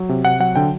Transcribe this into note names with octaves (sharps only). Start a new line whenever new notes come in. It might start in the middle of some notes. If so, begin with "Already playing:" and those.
Already playing: F#3
C3
C3 F#5
F#3 F#5
D3 G5